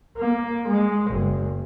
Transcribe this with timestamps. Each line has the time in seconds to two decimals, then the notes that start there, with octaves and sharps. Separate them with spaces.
0.17 A#3
0.67 G#3
1.11 F#1